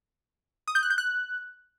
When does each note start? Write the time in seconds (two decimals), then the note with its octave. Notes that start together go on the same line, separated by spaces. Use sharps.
0.68 D#6
0.75 G6
0.83 F#6
0.90 G6
0.98 F#6